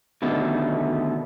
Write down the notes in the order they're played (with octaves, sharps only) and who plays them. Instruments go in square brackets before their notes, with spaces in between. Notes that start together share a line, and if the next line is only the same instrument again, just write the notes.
[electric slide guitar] B2 D3 D#3 A3 B3